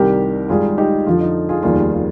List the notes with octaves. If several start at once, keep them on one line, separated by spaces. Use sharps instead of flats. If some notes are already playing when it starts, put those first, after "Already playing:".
Already playing: C2 C3 D#3 G3 G4 A#4
G#1 G#2 G3 F4 G#4
D#4 G4
F2 D3 F3 F4
D#4
F4 G#4
F1 D#2 D#3 G3 F4 G#4
F4